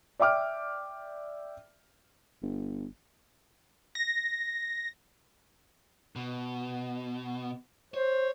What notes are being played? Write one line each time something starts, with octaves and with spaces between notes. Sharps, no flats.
D5 E5 G5 D6 F6
G1
A#6
B2
C5 C#5